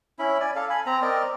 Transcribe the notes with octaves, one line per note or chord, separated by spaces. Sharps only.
C#4 E4 B5
D5 G#5
A4 F5
G#5 B5
C4 A#5
C4 A#4 D5 D#5